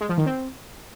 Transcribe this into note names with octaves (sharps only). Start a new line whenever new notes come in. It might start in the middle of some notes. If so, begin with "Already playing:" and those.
G#3
F3
D#3
C4